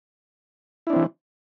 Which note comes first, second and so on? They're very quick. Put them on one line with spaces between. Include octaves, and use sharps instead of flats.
E4 D4 C4 E3